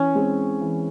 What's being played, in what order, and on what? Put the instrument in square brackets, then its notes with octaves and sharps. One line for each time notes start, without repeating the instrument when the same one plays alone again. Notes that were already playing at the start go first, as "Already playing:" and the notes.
Already playing: [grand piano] E3 [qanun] C#4
[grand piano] G#3 C4
E3